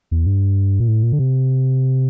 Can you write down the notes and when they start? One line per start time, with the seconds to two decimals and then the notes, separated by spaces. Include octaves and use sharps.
0.11 E2
0.26 G2
0.80 A#2
0.88 A2
1.03 A#2
1.12 D3
1.19 C3